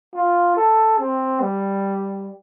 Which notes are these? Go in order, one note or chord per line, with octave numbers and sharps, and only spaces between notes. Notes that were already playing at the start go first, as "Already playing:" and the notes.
F4
A4
C4
G3